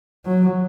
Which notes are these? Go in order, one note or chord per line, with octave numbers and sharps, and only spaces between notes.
F#3